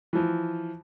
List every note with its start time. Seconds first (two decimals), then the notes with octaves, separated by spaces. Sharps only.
0.13 E3 F3